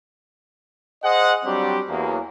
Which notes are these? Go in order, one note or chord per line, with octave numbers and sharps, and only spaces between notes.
G#4 C5 D#5 F#5
F#3 G3 C4 D4 G4
E2 F#3 A#3